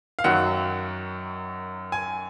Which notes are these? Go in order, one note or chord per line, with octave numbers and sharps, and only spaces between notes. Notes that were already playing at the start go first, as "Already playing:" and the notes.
F5
F#2 D#3 F#3 F#5
G#5